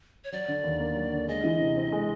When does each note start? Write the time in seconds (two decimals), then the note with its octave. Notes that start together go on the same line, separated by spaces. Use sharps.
0.24 C#5
0.32 F#3 D5
0.48 D3
0.64 D#2
0.80 A#3
0.96 F#3
1.12 D3
1.28 G#3 D#5
1.44 E3
1.60 C3
1.76 C4
1.92 G#3